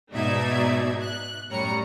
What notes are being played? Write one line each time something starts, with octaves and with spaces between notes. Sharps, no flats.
G#2 B2 D#4 D5 E5 G#6
F#6
F#2 A2 G3 C#5 A#5 C#7